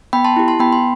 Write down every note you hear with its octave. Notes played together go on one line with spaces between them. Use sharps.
B3 G5 B5
A5 C6
E4 G4
A5 C6
B3 G5 B5
C6